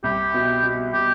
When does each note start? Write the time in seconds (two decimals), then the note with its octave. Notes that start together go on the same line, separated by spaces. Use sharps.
0.04 C2 G4
0.34 B2
0.63 B2
0.93 B2 G4